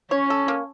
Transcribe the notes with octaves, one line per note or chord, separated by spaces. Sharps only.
C#4 C#5
A4
A#3